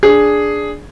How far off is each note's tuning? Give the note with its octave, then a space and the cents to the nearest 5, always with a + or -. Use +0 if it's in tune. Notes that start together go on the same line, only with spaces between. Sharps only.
D4 +0 G#4 +0